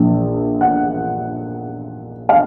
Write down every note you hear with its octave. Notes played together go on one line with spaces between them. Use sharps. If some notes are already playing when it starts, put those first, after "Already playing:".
Already playing: A#1 A#2 F3
F#5
F5